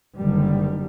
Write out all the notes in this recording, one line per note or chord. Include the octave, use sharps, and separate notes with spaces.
F#1 F#2 D3 D#3 G3